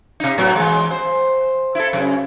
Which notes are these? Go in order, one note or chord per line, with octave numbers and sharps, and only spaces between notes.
C3 D#4
A2 F#3 B3
E3 G#3
C5
E4 A4
F#2 C#3